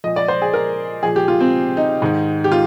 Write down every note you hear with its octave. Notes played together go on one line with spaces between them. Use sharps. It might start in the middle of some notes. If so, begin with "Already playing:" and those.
A#2 F3 D#5
D5
C5
G#4
A#4
A#2 F3 G#4
G4
F4
C4
D#4
G#2 D#3
G4
F4